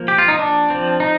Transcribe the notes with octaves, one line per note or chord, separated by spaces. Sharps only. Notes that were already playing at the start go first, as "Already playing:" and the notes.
Already playing: F3 A#3
G4
F4
D#4
D4
F3 C4
D#4